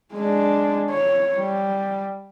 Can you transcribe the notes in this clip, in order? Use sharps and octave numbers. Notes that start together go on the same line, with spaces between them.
G#3 D4
C#5
G3